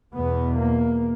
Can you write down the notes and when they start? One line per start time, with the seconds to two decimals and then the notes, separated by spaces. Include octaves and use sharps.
0.14 E2 B2 B3
0.57 A#3